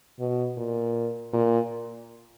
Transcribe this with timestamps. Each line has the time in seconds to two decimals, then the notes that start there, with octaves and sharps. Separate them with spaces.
0.19 B2
0.57 A#2
1.33 A#2